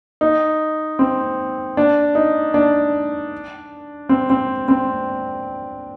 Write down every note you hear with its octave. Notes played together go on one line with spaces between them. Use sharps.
D#4
C4
D4
D#4
D4
C4
C4
C4